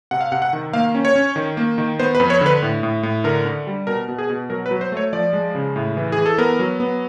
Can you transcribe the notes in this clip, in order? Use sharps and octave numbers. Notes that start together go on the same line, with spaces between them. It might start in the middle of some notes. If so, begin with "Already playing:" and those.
C3 F#5
F5
C3 F#5
F#5
D#3
A#3 F5
C#4
C#5
C#4
D#3
A#3
D#3
B3 C5
B4
F2
C#5
D3 B4
A2
A2
A2
D3 A#4
D3
G3
B2 A#4
B2
G#4
B2
F#3 A#4
B4
F#3
C5
A3 C#5
F3 D5
G#3
C#3
A2
E3
G#4
E3
A4
B3 A#4
F#3
B3